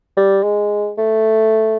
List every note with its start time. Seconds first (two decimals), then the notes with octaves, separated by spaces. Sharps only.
0.17 G3
0.43 G#3
0.98 A3